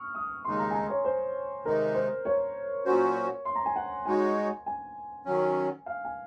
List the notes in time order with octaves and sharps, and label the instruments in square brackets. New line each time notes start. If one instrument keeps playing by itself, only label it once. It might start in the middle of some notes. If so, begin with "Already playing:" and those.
Already playing: [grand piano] C#6 D#6 F6
D#6
[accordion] D#2 C#3 G#3 D#4 [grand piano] C6
[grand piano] A#5
G#5
A#5
C#5
C5
[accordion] C3 D#3 G#3 D#4 [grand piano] A#4
[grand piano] C5
C#5
[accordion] A#2 F#3 C#4 F#4 C5
[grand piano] C6
A#5
G#5
F#5
[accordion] G#3 D#4 F#4 C#5 [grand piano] G#5
[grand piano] G#5
[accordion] D#3 F#3 C#4
[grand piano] F5
G#5